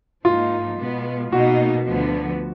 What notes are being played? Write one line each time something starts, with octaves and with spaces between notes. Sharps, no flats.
G#2 F3 A#3 D#4 F4
B2 G#3 B3
B2 A#3 D#4 F#4
D2 D3 F3 B3